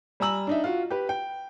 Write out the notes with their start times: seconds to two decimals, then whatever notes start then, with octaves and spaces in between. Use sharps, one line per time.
0.20 G3 G#5 A#5 E6 F#7
0.47 D4 D#4 E5
0.64 F4 F#4
0.90 G4 B4
1.09 G5